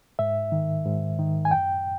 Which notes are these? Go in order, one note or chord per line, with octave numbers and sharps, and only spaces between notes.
G#2 E5
D#3
G#2
D#3
G#5
F#2 G5